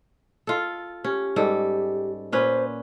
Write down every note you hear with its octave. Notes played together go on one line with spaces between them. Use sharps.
F4 A4
C#4 G4
G#2 G3 A4
A#2 C#4 B4 C5